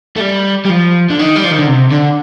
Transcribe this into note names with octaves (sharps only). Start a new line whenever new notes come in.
A3
G3
G3
F3
D3
D#3
G3
F3
D#3
D3
C3
D3